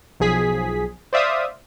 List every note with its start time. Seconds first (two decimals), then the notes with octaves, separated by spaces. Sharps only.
0.20 B1 F3 G#4 B6
1.13 C5 D5 E5 F5 D#6